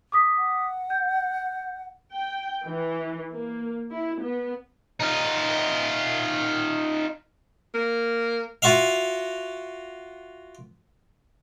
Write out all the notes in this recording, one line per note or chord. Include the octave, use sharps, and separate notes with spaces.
D6 D#6 B6
F#5
G6
G5
E3
A#3
E4
B3
D#4 F4
A#3
F4 F#4 E5 F5